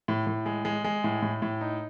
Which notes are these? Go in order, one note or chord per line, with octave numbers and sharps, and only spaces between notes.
A2
A2
G#3
G#3
G#3
A2
A2
A2
D#4